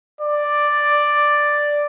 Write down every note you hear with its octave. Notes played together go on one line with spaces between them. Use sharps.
D5